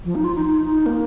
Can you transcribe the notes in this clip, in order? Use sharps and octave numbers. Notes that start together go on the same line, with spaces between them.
F3
D#4
F4
D#4
D#4
D#4
A#3